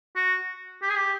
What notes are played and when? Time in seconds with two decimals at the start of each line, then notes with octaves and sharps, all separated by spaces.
0.16 F#4
0.82 G4
0.90 G#4
0.97 G4